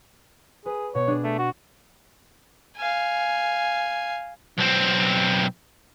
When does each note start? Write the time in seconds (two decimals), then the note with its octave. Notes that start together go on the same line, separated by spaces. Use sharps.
0.66 G#4 B4
0.95 B2 C#5
1.07 D4 G#4
1.24 A3 A6
1.39 F#4
2.77 F5 G#5
4.58 B1 C4